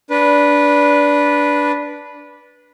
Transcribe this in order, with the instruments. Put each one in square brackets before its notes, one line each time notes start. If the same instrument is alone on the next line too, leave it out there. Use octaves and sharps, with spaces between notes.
[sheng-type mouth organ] D4 B4